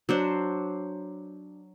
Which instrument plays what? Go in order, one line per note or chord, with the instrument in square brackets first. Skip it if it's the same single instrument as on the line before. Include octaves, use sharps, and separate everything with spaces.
[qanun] F#3 D4 C5